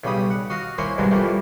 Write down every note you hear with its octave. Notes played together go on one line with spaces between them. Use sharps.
B1 C#3 G3 B5 D#6
F#5
F#4 D#5 F5
A#3 E4 C5 C#5 G#5
C2 G2 B2 F#3 G#3
E3 F3 G3 A3 A#3